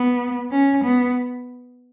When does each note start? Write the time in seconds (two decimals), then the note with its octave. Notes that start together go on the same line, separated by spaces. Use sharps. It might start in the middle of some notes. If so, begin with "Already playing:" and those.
Already playing: B3
0.51 C#4
0.84 B3